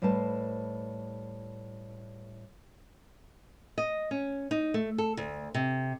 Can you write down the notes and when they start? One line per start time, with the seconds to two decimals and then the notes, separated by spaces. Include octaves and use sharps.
0.02 A2 G3 B4 C5 A5
3.78 D#5
4.11 C#4
4.51 D#4
4.74 A3
4.98 A4
5.17 D2
5.54 C3